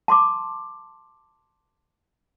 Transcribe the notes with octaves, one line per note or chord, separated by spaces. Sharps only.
A5 C6 D6